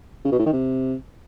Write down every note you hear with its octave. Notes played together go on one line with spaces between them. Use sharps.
C#3
B2
A2
D#3
C3